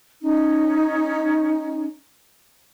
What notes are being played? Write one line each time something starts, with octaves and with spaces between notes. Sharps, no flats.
C#4 D#4